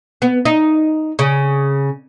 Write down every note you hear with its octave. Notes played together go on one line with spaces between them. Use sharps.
B3
D#4
C#3